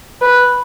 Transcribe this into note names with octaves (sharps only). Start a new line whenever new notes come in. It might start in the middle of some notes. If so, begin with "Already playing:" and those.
B4